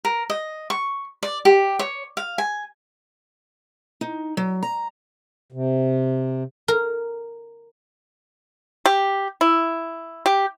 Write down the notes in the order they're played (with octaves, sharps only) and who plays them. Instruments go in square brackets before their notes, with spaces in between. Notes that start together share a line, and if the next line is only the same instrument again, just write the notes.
[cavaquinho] A#4
D#5
C#6
D5
G4
C#5
F5
G#5
[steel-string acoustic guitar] D#4
F#3
A#5
[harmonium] C3
[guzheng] A#4
[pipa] G4
E4
G4